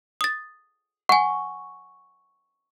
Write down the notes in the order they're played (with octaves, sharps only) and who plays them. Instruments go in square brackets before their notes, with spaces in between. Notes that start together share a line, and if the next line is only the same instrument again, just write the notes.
[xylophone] D#6 A6
[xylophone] F#5 G#5 [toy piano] C#6